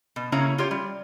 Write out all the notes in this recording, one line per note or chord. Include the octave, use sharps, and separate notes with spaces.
B2
C#3 A#3 C#4 E4 C#5 A#5
F4 G4 C#5
G3